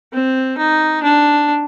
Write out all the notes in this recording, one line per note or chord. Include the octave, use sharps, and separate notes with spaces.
C4
D#4
D4